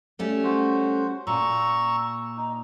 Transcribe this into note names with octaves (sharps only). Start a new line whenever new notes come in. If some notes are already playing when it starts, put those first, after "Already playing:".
G3 A3 C#4
F#4 C5
A#2 A#5 C#6 E6
D#4